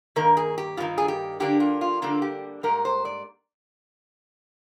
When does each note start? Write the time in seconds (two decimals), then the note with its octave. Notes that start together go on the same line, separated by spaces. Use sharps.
0.16 G2 D#3 A#3 A#4
0.37 G#4
0.58 G4
0.77 G2 D#3 A#3 F4
0.98 G#4
1.08 G4
1.40 D3 G3 A#3 D4 G4
1.60 F4
1.81 F4
2.02 D3 G3 A#3 D4 F4
2.22 G4
2.63 G#2 G3 A#3 A#4
2.85 C5
3.05 D5